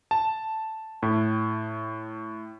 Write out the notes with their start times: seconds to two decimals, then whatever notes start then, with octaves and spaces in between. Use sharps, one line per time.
0.11 A5
1.03 A2